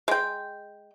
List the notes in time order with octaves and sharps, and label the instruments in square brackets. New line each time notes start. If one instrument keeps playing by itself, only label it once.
[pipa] G#3 G5